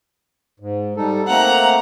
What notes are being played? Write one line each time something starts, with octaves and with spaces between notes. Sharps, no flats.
G#2
G3 D#4 A4
A3 A#3 C4 F#5 A#5